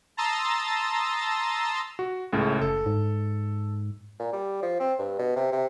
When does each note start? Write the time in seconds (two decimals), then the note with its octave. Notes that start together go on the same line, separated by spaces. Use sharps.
0.17 A5 A#5 C6 D#6 E6 A6
1.99 F#4
2.33 C#2 A2 C#3
2.62 F#1 A4
2.86 G#2
4.19 A#2
4.33 G3
4.62 F3
4.80 C4
4.99 G2
5.19 B2
5.36 C3
5.52 C3